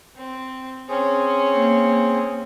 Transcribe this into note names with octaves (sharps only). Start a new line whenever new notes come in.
C4
C4 C#4 G#4
A#3